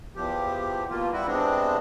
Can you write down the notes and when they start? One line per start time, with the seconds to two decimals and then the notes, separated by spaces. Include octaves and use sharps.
0.16 E2 F3 G4
0.90 B2 A#3 F4
1.13 G3 E4 F#4
1.27 C3 G#3 B3 C4 D4